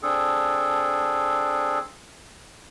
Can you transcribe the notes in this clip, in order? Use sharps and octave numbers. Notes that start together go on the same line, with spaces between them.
C4 D4 G#4 A4